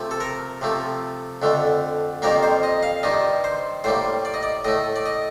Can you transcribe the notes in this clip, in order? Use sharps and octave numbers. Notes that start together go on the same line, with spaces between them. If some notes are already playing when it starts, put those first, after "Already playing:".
Already playing: C3 F3 A3
A4
A#4
C3 F3 A3
F2 D3 A3
F2 D#3 G3 A#3 A#4
C5
D#5
F5
G2 D#3 G3 D#5
C5
A2 G3 A#3 C5
D5
D#5
D5
A2 A3 D#5
D5
D#5